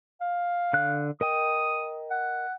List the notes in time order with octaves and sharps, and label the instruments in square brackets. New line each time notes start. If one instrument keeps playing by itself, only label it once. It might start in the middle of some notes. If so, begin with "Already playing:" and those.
[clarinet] F5
[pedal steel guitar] D3 F#6
[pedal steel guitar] A#4 D#5 G5 [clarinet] D#6
[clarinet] F#5